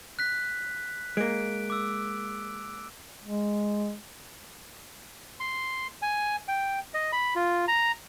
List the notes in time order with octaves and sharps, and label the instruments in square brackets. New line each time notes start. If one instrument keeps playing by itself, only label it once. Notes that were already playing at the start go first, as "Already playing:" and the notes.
[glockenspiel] F#6 B6
[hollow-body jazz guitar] G#3 A#3 [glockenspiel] D7
[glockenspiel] D6 E6
[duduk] G#3
[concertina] C6
G#5
G5
D#5
B5
F4
A#5